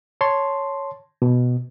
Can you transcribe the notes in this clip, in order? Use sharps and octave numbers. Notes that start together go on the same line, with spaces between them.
C#5 A5 C6
B2